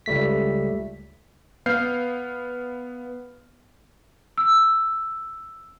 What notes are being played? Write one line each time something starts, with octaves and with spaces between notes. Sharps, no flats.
C#2 G3 A3 B6
B3 F5 F6 G6 C7
E6